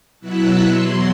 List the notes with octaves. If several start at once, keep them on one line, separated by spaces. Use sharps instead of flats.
B2 F#3 B3 E4 E6 F#6
E2 F#3 C6